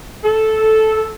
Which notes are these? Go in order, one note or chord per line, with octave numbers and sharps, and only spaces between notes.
A4